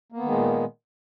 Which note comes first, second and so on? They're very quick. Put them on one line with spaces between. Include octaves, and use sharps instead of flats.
A#3 B3 D#3 G#3 A#2